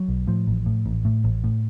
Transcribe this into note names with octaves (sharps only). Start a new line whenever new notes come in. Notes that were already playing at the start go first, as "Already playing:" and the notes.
Already playing: F#3
B1
A2 F3
A1
A2
A1
A2
A1
A2